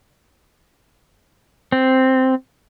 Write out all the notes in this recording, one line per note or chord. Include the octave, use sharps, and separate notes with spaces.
C4